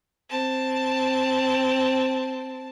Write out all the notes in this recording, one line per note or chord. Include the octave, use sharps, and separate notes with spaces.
C4 A5